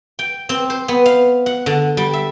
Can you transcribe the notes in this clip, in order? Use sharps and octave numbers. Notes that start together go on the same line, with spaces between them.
G5
C4
C5
B3
F5
F#5
D3
G3
E5